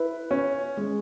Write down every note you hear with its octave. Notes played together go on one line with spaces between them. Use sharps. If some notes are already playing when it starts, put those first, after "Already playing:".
Already playing: E4 B4
C#4
G#3